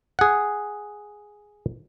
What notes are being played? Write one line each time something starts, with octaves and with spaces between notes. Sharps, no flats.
G#4 F#5